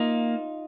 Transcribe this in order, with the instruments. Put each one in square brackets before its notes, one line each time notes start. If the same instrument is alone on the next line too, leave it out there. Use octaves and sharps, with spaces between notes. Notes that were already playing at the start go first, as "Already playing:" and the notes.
Already playing: [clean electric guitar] A#3 D#4 F4